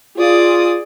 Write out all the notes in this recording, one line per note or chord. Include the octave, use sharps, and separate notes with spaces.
F4 G#4 D5 D#6